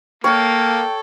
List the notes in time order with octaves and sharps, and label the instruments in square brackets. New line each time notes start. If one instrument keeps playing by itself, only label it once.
[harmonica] A#3 [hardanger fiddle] A4 [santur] C#5 [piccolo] G5